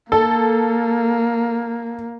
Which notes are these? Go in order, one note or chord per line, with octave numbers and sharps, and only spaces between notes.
A#3 A4